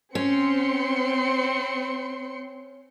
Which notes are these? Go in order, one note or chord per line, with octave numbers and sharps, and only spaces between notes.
C4 C#4 C6 C#7